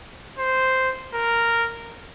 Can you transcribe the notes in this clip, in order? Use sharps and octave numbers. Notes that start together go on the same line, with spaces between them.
C5
A#4